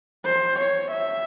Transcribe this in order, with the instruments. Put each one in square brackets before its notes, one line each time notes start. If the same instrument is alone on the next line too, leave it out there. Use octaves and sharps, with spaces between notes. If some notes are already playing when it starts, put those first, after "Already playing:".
[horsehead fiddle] C5
C#5
E5